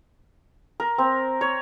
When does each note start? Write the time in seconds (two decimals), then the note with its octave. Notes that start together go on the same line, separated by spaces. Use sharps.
0.80 A#4
0.98 C4
1.41 C#5